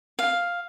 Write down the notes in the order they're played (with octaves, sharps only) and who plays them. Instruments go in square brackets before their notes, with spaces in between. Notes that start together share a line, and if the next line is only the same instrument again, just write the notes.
[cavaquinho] F5